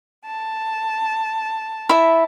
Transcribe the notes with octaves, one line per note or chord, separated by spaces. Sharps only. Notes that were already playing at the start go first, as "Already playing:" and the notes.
A5
E4 E5